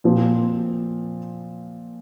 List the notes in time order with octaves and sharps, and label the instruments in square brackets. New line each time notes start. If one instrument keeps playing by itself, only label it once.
[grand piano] A#2 F3 C4